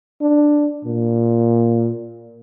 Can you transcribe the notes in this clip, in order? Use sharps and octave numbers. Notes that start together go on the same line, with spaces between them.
D4
A#2